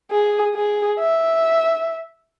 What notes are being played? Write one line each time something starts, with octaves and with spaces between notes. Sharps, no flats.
G#4
G#4
E5